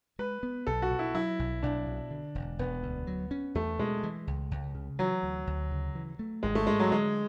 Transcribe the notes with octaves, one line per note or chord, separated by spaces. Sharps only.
G#3 B4
B3
B1 A4
F#4
B2
E4
F#3 E4
B1
B1 D4
B2
D3
E1
E1 B3
D2
F#3
C#4
E2 A3
B2 G#3
E3
C#2
C#2
C#3
E3 F#3
D2
D2
C#3
E3
A3
G#1 G#3
A3
G#2 G#3
F#3
D3 G#3